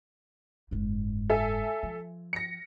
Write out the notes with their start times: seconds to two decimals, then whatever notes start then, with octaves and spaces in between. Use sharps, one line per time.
0.71 F#1 G#2
1.30 A4 E5 G#5
1.83 F3
2.33 A#6 C#7